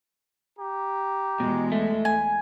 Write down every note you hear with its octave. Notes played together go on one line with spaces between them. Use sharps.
G4 A#5
E2 B2 G#3
A3
G#5